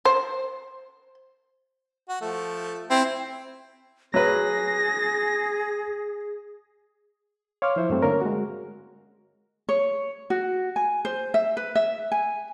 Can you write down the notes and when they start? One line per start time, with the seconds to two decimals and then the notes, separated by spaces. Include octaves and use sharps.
0.05 C5
2.09 F#4
2.21 F3 A3
2.90 C4 E4
4.14 F#3 G#4 B4 A#6
7.62 C#5 F5 C6 D6 F6
7.76 F3 E4 C5 E5
7.90 G2 F#3 A3 C4
8.02 D3 A#3 C#4 A#4 C#5
8.21 G#3 F#4
9.69 C#5
10.30 F#4
10.76 G#5
11.05 C5
11.34 E5
11.57 B4
11.75 E5
12.12 G#5